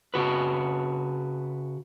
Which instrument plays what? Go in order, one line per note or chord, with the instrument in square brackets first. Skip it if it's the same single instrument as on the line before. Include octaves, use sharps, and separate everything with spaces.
[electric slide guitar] C#3 F#4 B4